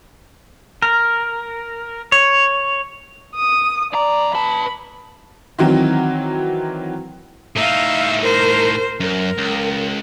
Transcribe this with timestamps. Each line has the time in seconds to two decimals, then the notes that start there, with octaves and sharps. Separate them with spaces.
0.82 A#4
2.12 C#5
3.36 D#6
3.93 F2 D5 A#5
4.35 B4 A5 B5
5.59 D#3 E3 F#3 C4
7.56 A2 D#4 E5 F5
8.21 A#4 C5
9.00 F#2 A#4
9.38 C#2